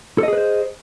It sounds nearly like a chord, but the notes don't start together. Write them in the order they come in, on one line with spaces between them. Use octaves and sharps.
A4 D#5 G#4 B4 C5